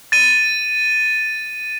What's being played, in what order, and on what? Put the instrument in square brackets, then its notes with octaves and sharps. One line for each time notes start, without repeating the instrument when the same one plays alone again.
[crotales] A6 D#7